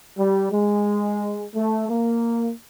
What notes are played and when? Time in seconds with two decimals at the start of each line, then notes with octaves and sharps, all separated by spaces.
0.17 G3
0.51 G#3
1.55 A3
1.89 A#3